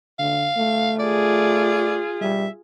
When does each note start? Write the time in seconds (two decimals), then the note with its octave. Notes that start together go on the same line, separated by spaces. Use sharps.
0.19 D3 F5
0.57 A3
1.00 F4 G#4 D5
2.21 G3 E5